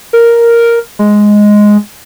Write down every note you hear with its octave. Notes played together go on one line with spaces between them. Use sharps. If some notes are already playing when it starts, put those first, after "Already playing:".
A#4
G#3